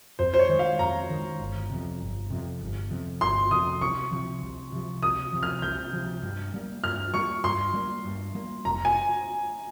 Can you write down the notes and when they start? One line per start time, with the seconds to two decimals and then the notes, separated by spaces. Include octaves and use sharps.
0.19 F2 C5
0.34 C5
0.39 C#5
0.49 D#3 G#3
0.59 F5
0.79 F2 A#5
1.10 D#3 G#3
1.39 G1
1.70 F2 C3
2.00 G1
2.30 F2 C3
2.61 G1
2.91 F2 C3
3.21 G1 C6
3.51 F2 C3 D#6
3.81 C2 C#6
4.11 C3 F3
4.42 C2
4.72 C3 F3
5.03 C2 D#6
5.32 C3 F3
5.43 F6
5.62 C2 G6
5.93 C3 F3
6.22 G2
6.54 G3 A#3
6.84 G2 F6
7.14 G3 A#3 C#6
7.44 G2 C6
7.74 G3 A#3
8.05 G2
8.35 G3 A#3
8.65 F1 A#5
8.85 G#5